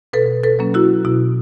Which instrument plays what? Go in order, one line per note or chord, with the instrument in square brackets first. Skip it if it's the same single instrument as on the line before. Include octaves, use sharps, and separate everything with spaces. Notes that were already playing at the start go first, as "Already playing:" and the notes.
[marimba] B2 A4 B4
A4 B4
F#3 A#3 C#4
E4 F#4
B2 E4